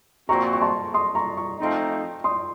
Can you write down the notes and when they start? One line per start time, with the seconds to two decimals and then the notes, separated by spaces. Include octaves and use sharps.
0.28 A#2 F3 C4 F#4 A#5 C#6
0.53 C#6
0.61 A5 C6
0.94 C6 D#6
1.15 A#5 C#6
1.37 A#5 C#6
1.60 F3 A3 C4 D#4
2.24 C6 D#6